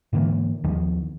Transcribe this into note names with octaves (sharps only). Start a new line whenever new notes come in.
G#2 D3 E3 A#3
D#2 D#3 F3